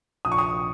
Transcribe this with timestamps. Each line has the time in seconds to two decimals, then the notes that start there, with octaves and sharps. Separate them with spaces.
0.25 A#1 D#6
0.32 C#6
0.38 D#6